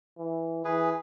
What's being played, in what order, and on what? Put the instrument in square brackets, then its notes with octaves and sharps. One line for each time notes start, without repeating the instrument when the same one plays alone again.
[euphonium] E3
[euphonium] E3 [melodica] G#4 B4